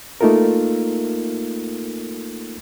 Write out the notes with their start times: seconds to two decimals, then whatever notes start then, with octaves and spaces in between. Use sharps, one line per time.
0.21 A3 A#3 D#4 F4 A4 A#4